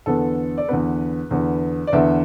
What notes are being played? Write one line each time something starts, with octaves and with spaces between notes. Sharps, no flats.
E2 D3 B3 A4
D5
E2 D3 B3 B4
E2 D3 B3
D5
E2 D3 B3 E5